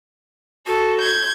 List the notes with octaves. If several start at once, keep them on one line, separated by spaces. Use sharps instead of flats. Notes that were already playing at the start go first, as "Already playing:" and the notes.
F#4 A4
G6 G#6